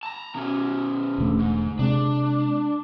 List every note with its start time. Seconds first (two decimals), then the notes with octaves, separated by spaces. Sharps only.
0.03 A5 A#5
0.35 B2 C#4
1.18 E1 D3 A3
1.39 G#2
1.79 C3 G#3 D4